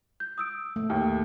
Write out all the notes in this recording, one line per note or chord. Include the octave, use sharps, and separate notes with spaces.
G6
D#6 E6 D7
A3
D#2